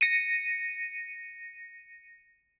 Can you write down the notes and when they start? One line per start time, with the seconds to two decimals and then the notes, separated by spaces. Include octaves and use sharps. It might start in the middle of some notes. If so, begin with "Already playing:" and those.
0.01 A#6 C#7 D#7